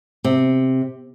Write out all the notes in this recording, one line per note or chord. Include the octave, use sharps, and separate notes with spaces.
C3